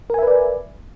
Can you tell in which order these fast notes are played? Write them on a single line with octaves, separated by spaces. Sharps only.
A#4 G#5 E5 B4 D5